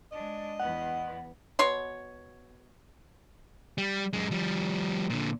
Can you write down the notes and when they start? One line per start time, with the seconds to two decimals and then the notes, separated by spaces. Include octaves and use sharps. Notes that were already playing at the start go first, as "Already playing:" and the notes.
0.12 G#3 D4 D#5
0.60 E2 B3 F#5
1.59 B2 F#4 C#5 C6
3.78 G3
4.13 F#2 G#3
4.31 F3 G3
5.10 A#2 D3